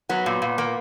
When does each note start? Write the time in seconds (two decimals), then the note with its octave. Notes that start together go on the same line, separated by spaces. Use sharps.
0.09 F#3 B3
0.26 A#2
0.42 A#2
0.58 A#3